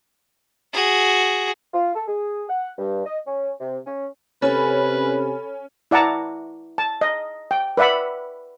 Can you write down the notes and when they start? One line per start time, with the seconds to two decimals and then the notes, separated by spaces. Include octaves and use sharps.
0.73 F#4 G#4
1.73 F4
1.94 A4
2.08 G#4
2.49 F#5
2.78 G2
3.05 D#5
3.26 C#4
3.59 C3
3.85 C#4
4.42 C3 C#4 A4 B4 G#5 B5
5.91 E4 D5 F#5 A5 A#5
6.78 A5
7.01 D#5
7.51 G5
7.77 B4 D5 E5 F#5 B5